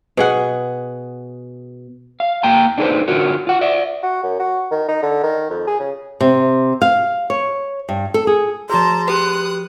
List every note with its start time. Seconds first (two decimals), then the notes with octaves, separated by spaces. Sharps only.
0.17 B2 G#4 F#5
2.20 F5
2.43 A#3 F5 G5 A#5
2.78 D4 D#4 G#4 A4 B4 C5
3.08 D3 F4 F#4 A#4 C#5
3.47 F4 F#5
3.61 D5 E5
4.03 F#4
4.23 F#2
4.39 F#4
4.71 D#3
4.88 D#4
5.02 D3
5.23 D#3
5.50 F2
5.67 G#4
5.79 C#3
6.20 C3
6.82 F5
7.30 C#5
7.89 G2
8.14 A4
8.27 G#4
8.70 F3 F#4 G#4 A5 A#5 C6
9.08 G4 B4 D#6 F#6